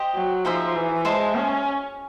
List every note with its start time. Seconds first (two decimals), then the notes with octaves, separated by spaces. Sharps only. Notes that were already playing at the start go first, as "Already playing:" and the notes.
Already playing: G4 C5 D#5
0.15 F#3
0.45 F3 D#4 G#4 C5 E5
0.76 E3
1.05 G#3 C5 E5 A5
1.35 C#4